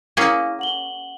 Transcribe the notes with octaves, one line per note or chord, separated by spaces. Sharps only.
A#3 C#4 E4 G#4 F5
F#5 F#7 G7